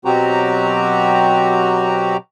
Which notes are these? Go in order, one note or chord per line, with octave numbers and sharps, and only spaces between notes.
B2 F#3 C4 F#4 G4 A#5